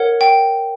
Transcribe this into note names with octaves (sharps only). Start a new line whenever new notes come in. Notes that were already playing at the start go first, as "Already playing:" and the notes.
Already playing: A#4 C#5 F#5
G5